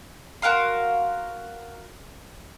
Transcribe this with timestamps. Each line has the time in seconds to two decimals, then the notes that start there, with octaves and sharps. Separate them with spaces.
0.42 F#4 A#4 F5 C6